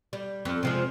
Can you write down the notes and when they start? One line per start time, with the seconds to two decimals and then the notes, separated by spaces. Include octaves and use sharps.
0.13 G3
0.45 F2
0.63 C3 F3 G#3